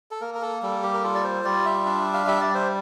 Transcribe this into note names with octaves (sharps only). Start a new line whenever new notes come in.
A4
A#3 A#4
A#4
A4
G3 A4
G4
A#4
F4 A4
D5
C5
G3 D5
E5
D4
F5
G3 E5
D5
C5